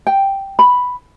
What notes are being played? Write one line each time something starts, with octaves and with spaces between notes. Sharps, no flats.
G5
B5